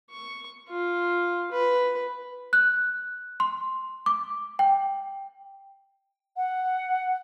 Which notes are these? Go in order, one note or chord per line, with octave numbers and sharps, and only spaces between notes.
C#6
F4
B4
F#6
C6
D6
G5
F#5